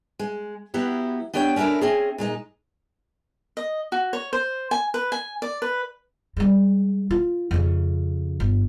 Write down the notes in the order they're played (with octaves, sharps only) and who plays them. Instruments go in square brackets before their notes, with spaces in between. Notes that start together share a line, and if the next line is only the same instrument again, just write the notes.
[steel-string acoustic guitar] G#3
F#3 B3 E4 G4
B3 D4 G4 C#5 D5 G5
C#4 D4 E4 A4 A#4
C4 C#4 G#4
A#2 G#3 D#4
[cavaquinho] D#5
F#4
C#5
C5
G#5
B4
G#5
D5
B4
[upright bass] G3 G#3
F4
F2 C#3
G1